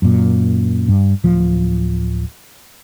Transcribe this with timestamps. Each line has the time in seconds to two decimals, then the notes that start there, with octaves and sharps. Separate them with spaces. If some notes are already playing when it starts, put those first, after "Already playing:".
0.02 F#2 A#2
0.88 G2
1.24 D1 F3